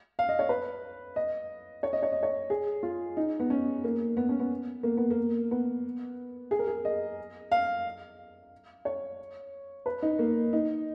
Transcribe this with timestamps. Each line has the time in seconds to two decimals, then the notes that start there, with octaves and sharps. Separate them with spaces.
0.19 F5
0.29 D#5
0.39 C#5
0.49 B4
1.16 D#5
1.83 C#5
1.93 D#5
2.02 C#5
2.12 D#5
2.23 C#5
2.50 G#4
2.83 F4
3.17 D#4
3.40 B3
3.50 C#4
3.84 A#3
4.17 B3
4.29 C#4
4.39 B3
4.83 A#3
4.97 B3
5.10 A#3
5.51 B3
6.51 G#4
6.59 A#4
6.67 G#4
6.85 D#5
7.52 F5
8.85 C#5
9.86 B4
10.02 D#4
10.19 A#3
10.53 D#4